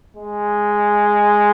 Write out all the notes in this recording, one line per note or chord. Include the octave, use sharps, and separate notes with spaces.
G#3